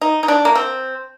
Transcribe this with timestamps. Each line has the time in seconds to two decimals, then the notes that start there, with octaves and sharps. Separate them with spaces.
0.01 D#4
0.23 D#4
0.28 D4
0.45 A#3
0.55 C4